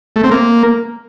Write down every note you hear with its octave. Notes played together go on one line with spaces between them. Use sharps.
A3
C4
A#3